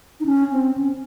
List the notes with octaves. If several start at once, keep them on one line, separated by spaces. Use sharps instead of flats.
D#4
C#4
C4
C#4